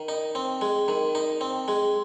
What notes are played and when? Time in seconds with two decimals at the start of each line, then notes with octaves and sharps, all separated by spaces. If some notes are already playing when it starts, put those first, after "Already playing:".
Already playing: D#3
0.08 D#4
0.35 C4
0.61 G#3
0.88 D#3
1.15 D#4
1.41 C4
1.68 G#3